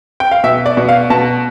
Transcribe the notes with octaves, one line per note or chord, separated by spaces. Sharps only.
G5
F5
B2 E5
D5
B2
F5
B2 A5